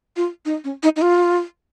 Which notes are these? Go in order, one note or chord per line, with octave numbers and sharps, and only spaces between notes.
F4
D#4
C#4
D#4
D#4
F4